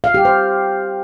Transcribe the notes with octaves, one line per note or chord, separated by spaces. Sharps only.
F5
G4
C5